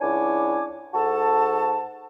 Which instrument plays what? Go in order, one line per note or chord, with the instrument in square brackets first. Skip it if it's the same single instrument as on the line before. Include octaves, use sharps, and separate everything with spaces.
[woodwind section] C#2 D4 E4 C#5 G#5 D6
G#2 F#4 A4 A5